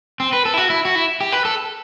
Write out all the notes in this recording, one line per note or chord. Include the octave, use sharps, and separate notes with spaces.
C4
B4
A4
E4
F#4
E4
F#4
E4
G4
B4
A4